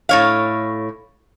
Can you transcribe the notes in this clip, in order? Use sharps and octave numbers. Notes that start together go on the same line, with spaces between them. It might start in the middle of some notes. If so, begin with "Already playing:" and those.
A2 C#5 F5